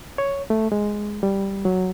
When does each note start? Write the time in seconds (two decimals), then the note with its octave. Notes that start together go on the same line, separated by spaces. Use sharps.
0.18 C#5
0.50 A3
0.72 G#3
1.23 G3
1.65 F#3